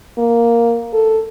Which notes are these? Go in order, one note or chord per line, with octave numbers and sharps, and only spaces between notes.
A#3
A4